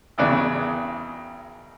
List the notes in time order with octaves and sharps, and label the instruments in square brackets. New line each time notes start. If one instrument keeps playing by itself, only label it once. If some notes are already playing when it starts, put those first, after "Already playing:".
[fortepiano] G#1 E2 C#3 D5 F#6